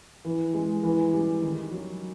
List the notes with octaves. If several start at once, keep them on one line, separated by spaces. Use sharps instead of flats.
E3
G#3
E3
G3
D#3
F#3